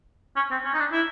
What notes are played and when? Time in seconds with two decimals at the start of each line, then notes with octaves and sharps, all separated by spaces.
0.36 C#4
0.51 C4
0.65 C#4
0.74 D#4
0.79 D4
0.92 E4